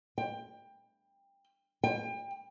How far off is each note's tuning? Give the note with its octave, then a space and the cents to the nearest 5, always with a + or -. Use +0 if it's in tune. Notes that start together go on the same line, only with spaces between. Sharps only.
G5 +20
G5 +35